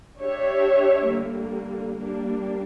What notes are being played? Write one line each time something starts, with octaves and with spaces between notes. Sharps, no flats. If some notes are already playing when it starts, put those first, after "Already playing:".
D4 G4 C#5 E5
D3 G3 A#3
G3 A#3 D4